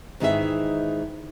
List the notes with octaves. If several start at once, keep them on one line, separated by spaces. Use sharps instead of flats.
G#2 D#3 E3 D#4 G#4 E5